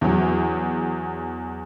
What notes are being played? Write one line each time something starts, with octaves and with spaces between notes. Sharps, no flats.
E2 F#3